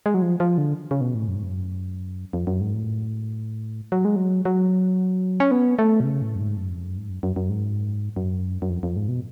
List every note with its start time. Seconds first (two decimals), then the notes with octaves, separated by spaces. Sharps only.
0.06 G#3
0.14 F#3
0.22 F3
0.40 F3
0.58 D3
0.91 C#3
1.01 B2
1.15 A2
1.28 F#2
1.35 G#2
1.43 F#2
2.33 F2
2.47 F#2
2.61 G#2
2.74 A2
3.92 F#3
4.05 G#3
4.16 F#3
4.45 F#3
5.40 C#4
5.51 B3
5.79 A3
6.00 B2
6.04 C#3
6.22 A2
6.35 F#2
6.40 G#2
6.57 F#2
6.70 F2
6.85 F#2
6.97 G#2
7.10 F#2
7.23 F#2
7.36 F#2
7.50 G#2
8.16 F#2
8.62 F#2
8.70 F2
8.83 F2
8.96 G#2
9.09 B2